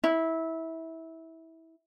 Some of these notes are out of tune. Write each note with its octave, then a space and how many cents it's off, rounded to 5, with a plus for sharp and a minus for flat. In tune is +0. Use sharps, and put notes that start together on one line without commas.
E4 -20